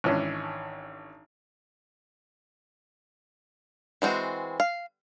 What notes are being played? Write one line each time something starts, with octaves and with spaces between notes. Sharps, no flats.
G#1 E3 C#4 D4
E3 G#3 C4 F#4
F5